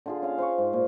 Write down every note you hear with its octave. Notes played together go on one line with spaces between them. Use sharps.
D3 F4 G#4
C#4 F5
C5 F5 C#6
G#2
A#2